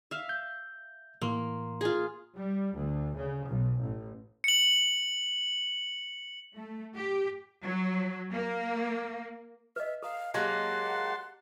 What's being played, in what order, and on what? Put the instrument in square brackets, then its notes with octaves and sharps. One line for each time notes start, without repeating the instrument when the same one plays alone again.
[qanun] E5 F5
[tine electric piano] G6
[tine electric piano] A2 E3 C6 [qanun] A#3
[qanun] F4 G#4
[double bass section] G3
D2
C#3
B1
A1
[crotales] C#7 F#7
[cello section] A3
G4
F#3
A#3
[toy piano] B4 D#5 [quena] E5
[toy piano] A4 A#5 [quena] F5
[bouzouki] F#3 G#3 A#3 [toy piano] G4 D#5 [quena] F#5 [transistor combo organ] A5 C6